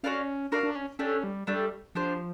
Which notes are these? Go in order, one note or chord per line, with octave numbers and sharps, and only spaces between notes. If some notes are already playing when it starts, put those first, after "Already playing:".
C#4 F#4 A#4 D5 F5
D4 F#4 A#4 D5 F5
D4
C#4
A3 C#4 D4 G4
G3
G3 A3 D4 G4
F3 D4 G4 C5